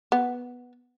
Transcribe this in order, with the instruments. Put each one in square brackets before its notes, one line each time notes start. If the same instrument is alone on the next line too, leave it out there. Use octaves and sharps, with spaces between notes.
[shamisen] B3